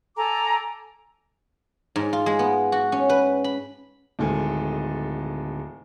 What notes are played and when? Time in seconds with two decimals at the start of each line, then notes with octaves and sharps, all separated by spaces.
0.16 A4 G#5 A#5 D6
1.96 G#2
2.13 F4
2.26 G#3
2.39 B3
2.72 F#4
2.92 C#4
3.09 B4
3.44 B5
4.19 D1 D#3 G#3 A4 G#5